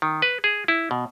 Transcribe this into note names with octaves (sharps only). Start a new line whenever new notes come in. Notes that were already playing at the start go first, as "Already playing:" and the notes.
D#3
B4
G#4
E4
B2